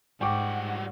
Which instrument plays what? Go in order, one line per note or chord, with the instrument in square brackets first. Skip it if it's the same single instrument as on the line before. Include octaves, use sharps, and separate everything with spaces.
[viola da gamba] G#2 [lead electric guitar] G3 F#5 [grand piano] G5 C#6 D6